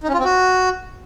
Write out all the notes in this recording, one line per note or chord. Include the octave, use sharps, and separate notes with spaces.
D#4
C#4
F4
C4
F#4